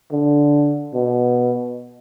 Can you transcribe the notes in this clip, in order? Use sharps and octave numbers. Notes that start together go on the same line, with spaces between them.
D3
B2